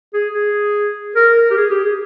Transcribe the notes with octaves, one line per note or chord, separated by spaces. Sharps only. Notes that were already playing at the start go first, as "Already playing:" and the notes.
G#4
G#4
A#4
A#4
G4
G#4
G4
G#4